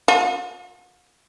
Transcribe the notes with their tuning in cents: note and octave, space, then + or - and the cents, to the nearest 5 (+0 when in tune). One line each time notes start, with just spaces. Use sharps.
F#4 -45